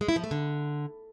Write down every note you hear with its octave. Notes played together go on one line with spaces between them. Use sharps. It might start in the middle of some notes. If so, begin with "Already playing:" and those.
G#3
E4
F3
A3
D3